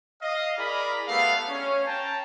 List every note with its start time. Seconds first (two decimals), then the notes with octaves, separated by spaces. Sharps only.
0.22 D#5 F5
0.57 E4 G#4 A#4 D5 A#5 B5
1.08 G3 A3 B3 A4 F5
1.48 C#4 C#5
1.86 G5 A5 A#5